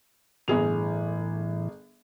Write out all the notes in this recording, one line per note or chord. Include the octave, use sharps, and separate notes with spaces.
G1 A2 E3 G#4 F7